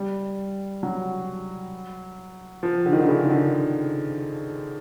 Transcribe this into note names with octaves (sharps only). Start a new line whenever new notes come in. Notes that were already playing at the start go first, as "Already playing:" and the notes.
Already playing: G3
F#3
F3
D3
D#3
D3
C#3
D#3
D3